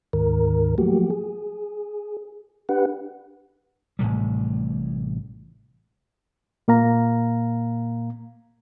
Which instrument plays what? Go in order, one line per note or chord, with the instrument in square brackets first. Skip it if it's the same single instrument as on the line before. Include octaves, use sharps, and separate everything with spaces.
[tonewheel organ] D2 G#2 D#3 A#4
F3 F#3 A3 A#3 F#4 G4
G#4
D4 G4 B4 F#5
[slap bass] A1 A2 C3 G3
[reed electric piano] A#2 A#3 F5 A#5